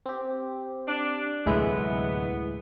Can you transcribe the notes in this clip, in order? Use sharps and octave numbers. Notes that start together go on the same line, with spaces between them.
C4 G4
D4
D2 A2 C3 F#3 G#3 B3 E4